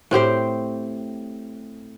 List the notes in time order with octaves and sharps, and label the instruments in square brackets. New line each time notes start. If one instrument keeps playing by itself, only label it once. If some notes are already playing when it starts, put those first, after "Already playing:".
[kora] A2 C4 G4 C5